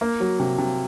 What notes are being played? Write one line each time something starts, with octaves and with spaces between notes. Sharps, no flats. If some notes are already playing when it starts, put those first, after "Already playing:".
A#3
F#3
C3
C3